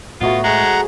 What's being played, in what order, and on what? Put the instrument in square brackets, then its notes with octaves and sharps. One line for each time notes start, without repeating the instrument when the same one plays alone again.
[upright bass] A2 [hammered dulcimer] A3 F#4 C#5 [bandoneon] B3 [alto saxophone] F4
[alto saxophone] G#3 [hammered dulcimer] G#4 C5 [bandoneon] F#5 A#5